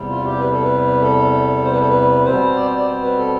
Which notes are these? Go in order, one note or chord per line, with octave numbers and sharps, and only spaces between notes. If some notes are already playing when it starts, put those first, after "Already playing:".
Already playing: E2 C3 G3
F4
G4
B4
A4
B4
A4
C5
B4
A4
B4
B2 G3 C4 C5
D5
C5
D5
C5
B4
A4